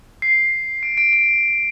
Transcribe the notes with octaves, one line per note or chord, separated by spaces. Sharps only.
C7
D7
D7
D7